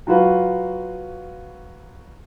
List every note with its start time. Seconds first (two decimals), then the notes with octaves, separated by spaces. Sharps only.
0.07 F#3 F4 F#4 B4 F5